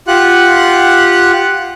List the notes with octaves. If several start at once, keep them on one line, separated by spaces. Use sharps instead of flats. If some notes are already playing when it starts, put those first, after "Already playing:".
F4 G4 F#5 F#6